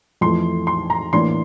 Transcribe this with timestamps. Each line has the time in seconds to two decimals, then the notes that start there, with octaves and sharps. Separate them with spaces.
0.21 F2 E3 A3 C6
0.67 C6
0.90 A#5
1.13 A2 E3 A#3 D4 C6